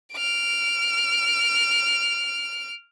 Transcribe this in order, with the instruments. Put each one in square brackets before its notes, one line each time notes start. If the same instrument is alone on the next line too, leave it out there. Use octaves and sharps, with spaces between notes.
[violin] F6 D7